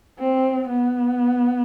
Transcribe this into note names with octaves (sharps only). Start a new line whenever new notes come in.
C4
B3